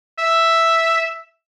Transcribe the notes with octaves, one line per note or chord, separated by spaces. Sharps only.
E5